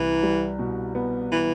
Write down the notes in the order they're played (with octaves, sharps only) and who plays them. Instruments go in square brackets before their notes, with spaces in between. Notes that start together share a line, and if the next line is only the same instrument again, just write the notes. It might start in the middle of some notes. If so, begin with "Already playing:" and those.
Already playing: [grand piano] C2 [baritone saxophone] E3
[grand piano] G3
B2
B3
[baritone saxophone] E3